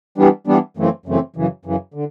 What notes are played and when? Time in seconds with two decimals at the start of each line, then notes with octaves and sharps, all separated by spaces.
0.18 E3 G3 B3 D4
0.47 E3 G3 B3 D4
0.77 F#2 C#3 E3 A3 C4
1.06 F#2 C#3 E3 A3 C4
1.36 F#2 C#3 E3
1.65 F#2 C#3 E3
1.94 D3